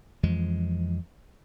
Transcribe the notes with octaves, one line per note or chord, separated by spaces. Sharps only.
F2 E3 F3 G#3